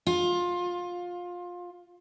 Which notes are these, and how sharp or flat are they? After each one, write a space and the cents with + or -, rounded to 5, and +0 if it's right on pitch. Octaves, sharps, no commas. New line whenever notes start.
F4 +20